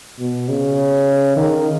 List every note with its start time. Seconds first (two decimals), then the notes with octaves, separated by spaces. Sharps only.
0.19 B2
0.49 C#3
1.37 D#3